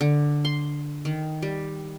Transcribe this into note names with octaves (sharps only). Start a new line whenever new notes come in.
D3
C6
D#3
G3